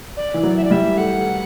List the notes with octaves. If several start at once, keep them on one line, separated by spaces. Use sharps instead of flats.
D5
E3
F#3
E5
D5
G3 E5
A3 F#5
A3